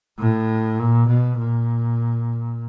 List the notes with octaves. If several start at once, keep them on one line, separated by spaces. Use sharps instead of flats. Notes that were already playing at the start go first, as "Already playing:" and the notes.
A2
A#2
B2
A#2